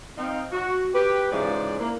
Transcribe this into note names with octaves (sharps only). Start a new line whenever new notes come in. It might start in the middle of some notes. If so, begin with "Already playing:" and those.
C4 D#4 F5
F#4
G4 B4
G#2 C#3 E3 F3 G#4 D5
A#3 D4 E4